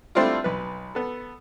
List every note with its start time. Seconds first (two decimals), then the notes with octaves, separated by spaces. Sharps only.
0.15 G3 A3 C4 D4 E4 F4
0.44 B1 B4
0.95 B3 A4